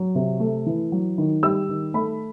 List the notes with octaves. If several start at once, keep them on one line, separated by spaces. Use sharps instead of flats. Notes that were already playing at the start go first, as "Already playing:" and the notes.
Already playing: F#3
C3
A3
E3
F#3
D#3
G3 E6
D#3
A3 B5